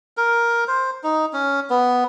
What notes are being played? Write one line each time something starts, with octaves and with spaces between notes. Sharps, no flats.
A#4
C5
D#4
C#4
B3